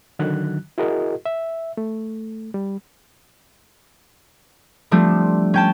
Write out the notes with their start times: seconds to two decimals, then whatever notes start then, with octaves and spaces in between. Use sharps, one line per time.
0.19 D3 D#3 F#3 F#6
0.78 E4 F#4 G#4 A#4 D#5
1.26 E5
1.77 A3
2.54 G3
4.91 F3 G3 A3 C4 D4
5.54 C#4 G5 A5